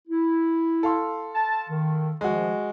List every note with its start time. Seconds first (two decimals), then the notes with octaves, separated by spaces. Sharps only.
0.08 E4
0.83 A4 F5 C6
1.35 A5
1.69 D#3
2.21 D#3 F3 G#3 A3 F#4